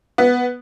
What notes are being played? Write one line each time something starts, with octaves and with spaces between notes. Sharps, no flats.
B3